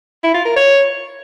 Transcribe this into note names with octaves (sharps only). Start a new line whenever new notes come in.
E4
F4
A#4
C#5